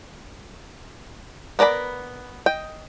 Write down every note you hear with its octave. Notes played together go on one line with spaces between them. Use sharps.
B3 A#4 D5 G#5 B5
D#5 G5